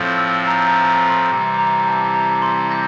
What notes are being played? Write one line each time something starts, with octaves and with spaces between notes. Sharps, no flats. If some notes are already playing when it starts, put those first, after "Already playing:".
Already playing: A2 F3 C4
E6
A#5
A#5
A#5
C6
C3 E3 G3
A#5
A5
A#5
C6
G6 A#6